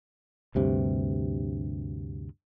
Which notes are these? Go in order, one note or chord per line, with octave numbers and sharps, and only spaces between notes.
D2 G2 C3